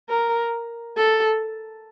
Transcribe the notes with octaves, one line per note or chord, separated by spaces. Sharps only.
A#4
A4